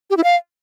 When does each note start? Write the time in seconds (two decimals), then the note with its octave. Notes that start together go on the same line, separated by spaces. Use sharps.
0.10 G4
0.17 E4
0.24 F5